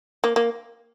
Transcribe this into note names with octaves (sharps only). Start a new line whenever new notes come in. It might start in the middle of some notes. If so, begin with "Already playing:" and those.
A#3
A#3